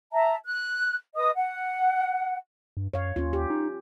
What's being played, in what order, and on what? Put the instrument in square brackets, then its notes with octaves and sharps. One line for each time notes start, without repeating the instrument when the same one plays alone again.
[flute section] E5 A5 A#5
F#6
B4 D#5 D#6
F#5
[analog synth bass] G2
[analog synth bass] F#2 [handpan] C#5 F5
[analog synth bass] D#2 [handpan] C#4 F4
[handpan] G4
[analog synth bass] D#4